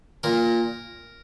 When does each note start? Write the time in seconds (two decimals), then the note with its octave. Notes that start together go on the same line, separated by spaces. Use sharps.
0.23 A#2 A#4